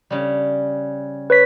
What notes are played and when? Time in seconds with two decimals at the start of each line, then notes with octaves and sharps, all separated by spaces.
0.10 C#3 G3
1.30 B4 C#5 B6